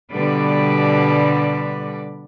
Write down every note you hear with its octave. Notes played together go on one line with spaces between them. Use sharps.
B2 D3 G3 B4 D5